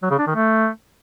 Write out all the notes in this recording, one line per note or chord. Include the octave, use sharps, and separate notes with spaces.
F#3
C#3
D4
D#3
A3